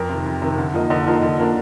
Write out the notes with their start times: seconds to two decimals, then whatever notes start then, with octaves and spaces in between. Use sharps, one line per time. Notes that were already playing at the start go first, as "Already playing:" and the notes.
Already playing: F2 A#4
0.09 C3 D#3
0.26 F2
0.42 C3 D#3
0.58 D3
0.74 F3 A#3 D#4
0.90 D3 D#5
1.07 F3 A#3 D#4
1.22 D3
1.38 F3 A#3 D4